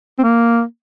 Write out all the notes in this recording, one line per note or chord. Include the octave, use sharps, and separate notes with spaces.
C4
A#3